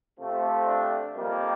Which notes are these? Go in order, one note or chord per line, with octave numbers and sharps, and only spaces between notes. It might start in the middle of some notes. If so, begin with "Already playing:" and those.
C3 F3 A3
D4
F2 D#3 G3 A#3